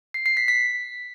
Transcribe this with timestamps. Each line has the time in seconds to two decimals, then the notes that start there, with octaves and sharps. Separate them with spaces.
0.14 C7
0.26 C7
0.37 B6
0.48 B6